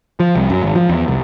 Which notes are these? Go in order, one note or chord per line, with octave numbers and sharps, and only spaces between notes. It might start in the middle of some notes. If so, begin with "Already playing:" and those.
F3
C2
F#2
G#1
F3
E2
C2